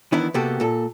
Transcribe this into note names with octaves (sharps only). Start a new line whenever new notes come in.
D#3 E3 B3 D4 E4
C3 A#3 B3 F#4 G4 A4
A#2 A4